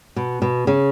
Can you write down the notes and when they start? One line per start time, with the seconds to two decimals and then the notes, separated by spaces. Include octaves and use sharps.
0.16 B2
0.42 B2
0.67 C#3